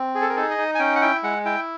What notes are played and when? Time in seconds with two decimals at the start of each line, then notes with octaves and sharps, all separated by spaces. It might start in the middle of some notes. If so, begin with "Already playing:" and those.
Already playing: C4
0.15 G#4
0.21 A4
0.29 A#4
0.36 D#4 A4
0.50 D#5
0.58 D#4
0.75 G#5
0.79 C#4 G5
0.96 F#5
1.01 E4 G5
1.23 G#3 F#5
1.45 E4 G5